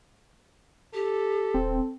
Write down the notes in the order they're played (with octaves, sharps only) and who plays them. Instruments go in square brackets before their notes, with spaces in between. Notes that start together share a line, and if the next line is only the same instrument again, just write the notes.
[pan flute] G4 [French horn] A4
[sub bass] D#1 [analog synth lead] C4